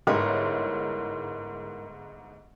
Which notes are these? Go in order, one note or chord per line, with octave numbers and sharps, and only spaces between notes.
G1 G#2 E4 A#4 C#5